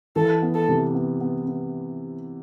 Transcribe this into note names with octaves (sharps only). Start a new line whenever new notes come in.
E3 A4
B3
A4
C3
B3
B3
B3